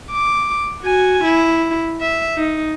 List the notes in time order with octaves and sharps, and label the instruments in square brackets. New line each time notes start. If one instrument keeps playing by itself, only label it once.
[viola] D6
F#4 G#5
E4
E5
D#4